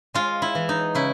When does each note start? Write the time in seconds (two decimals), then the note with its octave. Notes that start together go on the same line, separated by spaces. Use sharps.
0.14 G#3 F4
0.42 E4
0.55 E3
0.69 D#4
0.95 C#3 E4